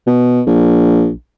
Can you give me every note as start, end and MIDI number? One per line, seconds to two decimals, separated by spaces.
0.07 0.41 47
0.46 1.10 34